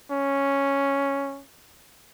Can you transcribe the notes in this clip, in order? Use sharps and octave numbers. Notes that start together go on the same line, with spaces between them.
C#4